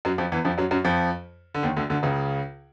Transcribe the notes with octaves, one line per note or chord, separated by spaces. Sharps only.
F#2 F#3
F2 F3
E2 E3
F2 F3
F#2 F#3
F#2 F#3
F2 F3
D3
D#2 D#3
D2 D3
D2 D3
C#2 C#3